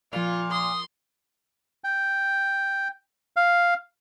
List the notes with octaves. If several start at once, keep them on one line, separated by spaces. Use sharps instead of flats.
A#2 F3 F4 F7
C6 D#6
G5
F5